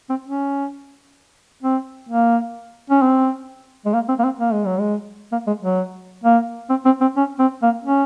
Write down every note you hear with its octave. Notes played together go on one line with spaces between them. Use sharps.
C4
C#4
C4
A#3
C#4
C4
G#3
A#3
C4
A#3
C4
A#3
G#3
F#3
G#3
A#3
G#3
F#3
A#3
C4
C4
C4
C#4
C4
A#3
C#4